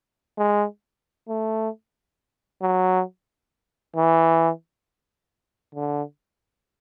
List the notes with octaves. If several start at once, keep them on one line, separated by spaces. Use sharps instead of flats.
G#3
A3
F#3
E3
D3